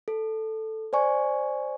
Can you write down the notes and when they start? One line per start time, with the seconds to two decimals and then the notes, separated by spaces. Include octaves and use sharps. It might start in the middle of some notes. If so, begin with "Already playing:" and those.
0.08 A4
0.93 C5 D5 G#5 C#6